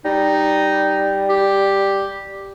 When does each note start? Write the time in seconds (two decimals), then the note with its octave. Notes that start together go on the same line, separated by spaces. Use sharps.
0.05 G3 D#4
1.29 G4